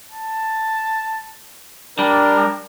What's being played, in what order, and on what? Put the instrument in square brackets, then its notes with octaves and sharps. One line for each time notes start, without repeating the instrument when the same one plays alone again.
[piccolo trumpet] A5
[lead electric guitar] G3 [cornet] D4 [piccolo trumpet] A#4